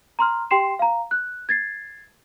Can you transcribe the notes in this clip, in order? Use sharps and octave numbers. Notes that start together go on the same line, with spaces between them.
A#5 C6 F6
G4 G5 C6 C7 E7
F5 A#5
F#6
G#6 A6 C7